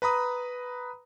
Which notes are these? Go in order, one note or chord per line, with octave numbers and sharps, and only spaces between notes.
B4 A#5 B5 D#6